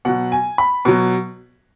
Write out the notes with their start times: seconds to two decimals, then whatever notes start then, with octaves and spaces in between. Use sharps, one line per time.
0.05 B2 F#3 F#5
0.32 G#5
0.58 B5
0.85 B2 F#3